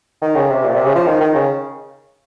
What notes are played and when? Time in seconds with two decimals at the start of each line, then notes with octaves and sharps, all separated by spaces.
0.22 D#3
0.35 C#3
0.50 C3
0.64 A#2
0.75 C3
0.85 C#3
0.95 F3
1.07 D#3
1.21 D#3
1.35 C#3